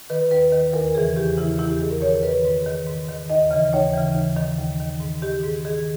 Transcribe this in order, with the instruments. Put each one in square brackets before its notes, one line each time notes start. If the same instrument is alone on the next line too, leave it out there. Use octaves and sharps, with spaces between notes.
[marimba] D#3 B4
D#2 B4
D#3
E2 A#4
C#3 E3 G#4
E2 G4
C#3 E3 E4
E2 E4
G4
D#3 G#4
A#4
E2 C#5
D#3 B4
G#2
D#3
G#2
D#3
D#2 D#5
C#3 E3 D#5
D#2 C#5
C#3 E3
D#2
D#3
D#2
D#3
G#2
D#3 G4
G#2 G#4
D#3 G#4